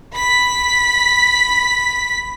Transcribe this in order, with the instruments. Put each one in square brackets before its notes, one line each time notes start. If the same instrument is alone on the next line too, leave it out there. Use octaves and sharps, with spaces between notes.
[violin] B5 B6